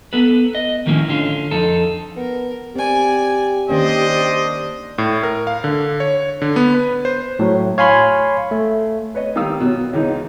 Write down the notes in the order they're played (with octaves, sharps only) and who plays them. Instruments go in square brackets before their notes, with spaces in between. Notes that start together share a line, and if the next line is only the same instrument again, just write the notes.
[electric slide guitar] B3 A4 B4
D#5
A2 D#3 F3 A#3 C#4 E4
D3 C#4 F4
F2 D#4 A4
[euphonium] B3 [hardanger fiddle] A#4
[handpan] C4 [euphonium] G4 [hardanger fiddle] D5 G#5
[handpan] D#3 A#3 C#4 [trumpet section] D4 C5 D#5 [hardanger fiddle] D5
[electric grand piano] A2
A#4
F5
D3
C#5
D3
B3
B4
C5
[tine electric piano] A2 F#3
C#5 F5 G#5 B5 C6
A3
[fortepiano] B4 C#5 D#5
D#3 G3 F5 D#6 E6
B2 F#3
C#2 E3 D#4